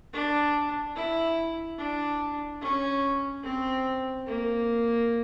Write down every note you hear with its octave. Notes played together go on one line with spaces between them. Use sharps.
D4
E4
D4
C#4
C4
A#3